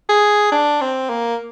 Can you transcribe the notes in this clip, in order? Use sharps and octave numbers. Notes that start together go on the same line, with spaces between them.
G#4
D4
C4
A#3